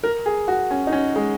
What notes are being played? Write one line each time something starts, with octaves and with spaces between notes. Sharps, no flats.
A#4
G#4
F#4
C#4
D#4
C#4
G#3